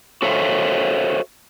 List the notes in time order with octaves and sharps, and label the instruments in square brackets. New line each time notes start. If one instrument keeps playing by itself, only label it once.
[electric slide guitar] F#4 A4 C5 C#5 E5 F5